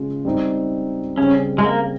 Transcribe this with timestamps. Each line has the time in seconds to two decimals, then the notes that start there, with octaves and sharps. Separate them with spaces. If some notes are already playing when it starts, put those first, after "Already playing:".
Already playing: C#3 G#3 C#4 F4
0.25 G3 C4 D#4
1.18 C#3 G3 C4 C#4
1.58 G#3
1.64 A#3